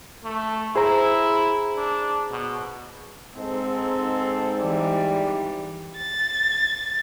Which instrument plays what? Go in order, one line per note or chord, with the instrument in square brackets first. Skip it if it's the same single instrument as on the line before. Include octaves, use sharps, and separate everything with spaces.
[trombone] A3
[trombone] E4 [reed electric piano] G#4 C5 A#5
[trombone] D4
B2
[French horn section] G#2 [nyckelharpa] C4 [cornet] A4
[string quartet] E3 G3 [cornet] D5
[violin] A6